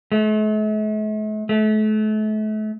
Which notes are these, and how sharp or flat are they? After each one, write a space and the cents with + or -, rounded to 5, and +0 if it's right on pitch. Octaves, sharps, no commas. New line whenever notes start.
A3 -45
A3 -35